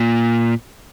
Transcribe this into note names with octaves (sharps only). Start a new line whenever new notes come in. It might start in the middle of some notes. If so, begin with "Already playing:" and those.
Already playing: A#2